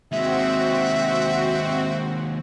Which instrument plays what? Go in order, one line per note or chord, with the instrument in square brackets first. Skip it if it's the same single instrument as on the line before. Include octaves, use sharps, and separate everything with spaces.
[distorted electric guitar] D#2 G#3 [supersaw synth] C4 F#4 [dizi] E5